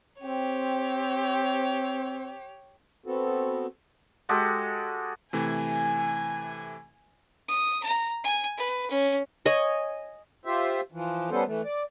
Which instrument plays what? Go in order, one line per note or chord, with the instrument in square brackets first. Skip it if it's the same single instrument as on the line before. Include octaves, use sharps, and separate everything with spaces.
[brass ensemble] C4 [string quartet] G4 C#5
[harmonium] B3 C4 F#4 A4
[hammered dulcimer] G#3 F#4 G4 A4
[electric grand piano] C3 E3 A3 [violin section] G#5
[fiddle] D#6
A#5
G#5
B4
C#4
[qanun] C#5 D#5 G#5
[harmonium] F4 G4 C5 E5
E3 F3
G3 B3 C#4 A4 C5
E3 A3
D5